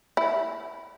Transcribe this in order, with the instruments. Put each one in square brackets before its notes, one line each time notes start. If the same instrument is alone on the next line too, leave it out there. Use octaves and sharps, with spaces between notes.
[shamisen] E4